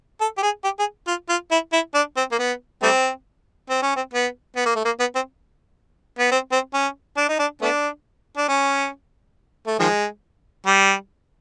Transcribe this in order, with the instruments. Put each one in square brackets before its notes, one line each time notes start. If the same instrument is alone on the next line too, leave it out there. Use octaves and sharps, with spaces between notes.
[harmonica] A4
G4
G#4
G4
G#4
F4
F4
E4
E4
D4
C4
A#3
B3
G3 A3 C4
C4
C#4
C4
B3
B3
A#3
A3
A#3
B3
C4
B3
C4
C4
C#4
D4
D#4
D4
A3 B3 D4
D4
C#4
A3
D#3 F3 G#3
G3